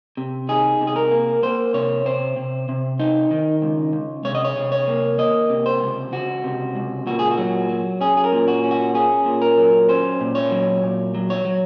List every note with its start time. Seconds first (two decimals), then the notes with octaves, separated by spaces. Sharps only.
0.17 C3
0.49 D#4 G#4
0.81 C3
0.87 G#4
0.96 A#4
1.11 A#3
1.43 A#3 C5
1.74 C3 C#5
2.05 C3 C5
2.36 C3
2.69 C3
2.99 D#4
3.31 D#3
3.62 C#2
3.93 C#2
4.25 C3 C#5
4.35 D#5
4.45 C#5
4.56 C3
4.72 C#5
4.88 A#3
5.18 A#3 D#5
5.50 C3
5.66 C5
5.81 C#2
6.12 C#2 F#4
6.44 C3
6.76 C#2
7.07 A#2 F#4
7.19 G#4
7.31 F#4
7.38 F#3
7.69 F#3
8.01 C#4 G#4
8.17 G#4
8.24 A#4
8.32 A#2
8.48 F#4
8.64 C#4
8.71 F#4
8.95 C#4 G#4
9.26 A#2
9.42 A#4
9.58 F#3
9.89 C#4 C5
10.21 A#2
10.35 C#5
10.51 F#3
10.82 A#2
11.15 F#3
11.30 C#5
11.45 F#3